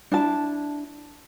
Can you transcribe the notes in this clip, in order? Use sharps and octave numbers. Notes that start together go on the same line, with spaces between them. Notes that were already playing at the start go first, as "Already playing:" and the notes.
D4 E4 A5